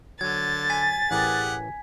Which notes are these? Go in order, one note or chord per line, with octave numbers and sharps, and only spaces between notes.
D3 F#3 G#6 A6
G#5 B6
A1 E3 G4 G#4 A#4 F#5